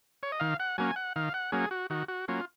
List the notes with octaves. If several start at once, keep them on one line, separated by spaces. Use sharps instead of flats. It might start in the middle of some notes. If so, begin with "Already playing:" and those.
C#5
D#5
D#3 F5
F#5
F#3 A#3 C#4 G#5
F#5
D#3 F5
F#5
F#3 A#3 C#4 G#4
F#4
D#3 F#4
F#4
F#3 A#3 C#4 F4